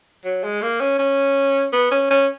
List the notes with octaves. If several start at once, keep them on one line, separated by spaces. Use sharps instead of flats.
F#3
G#3
A#3
C#4
C#4
B3
C#4
C#4